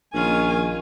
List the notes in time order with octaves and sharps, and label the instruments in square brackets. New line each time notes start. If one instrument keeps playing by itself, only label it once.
[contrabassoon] A#1 [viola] D#3 G#5 [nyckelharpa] C#4 F4